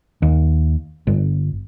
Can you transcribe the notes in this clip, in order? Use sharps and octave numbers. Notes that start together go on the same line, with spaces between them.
D#2
G1